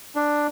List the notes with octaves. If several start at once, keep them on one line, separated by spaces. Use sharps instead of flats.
D4